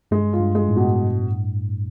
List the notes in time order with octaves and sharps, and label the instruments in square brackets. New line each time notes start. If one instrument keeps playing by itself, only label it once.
[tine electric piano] G2 [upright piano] G#3
[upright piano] F4
[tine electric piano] G2
[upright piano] G#3
[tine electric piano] A2
[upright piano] B2